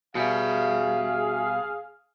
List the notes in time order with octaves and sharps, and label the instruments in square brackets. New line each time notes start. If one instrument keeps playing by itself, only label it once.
[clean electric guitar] B2 G3 [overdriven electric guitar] F#4 E5 [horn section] G#4 F5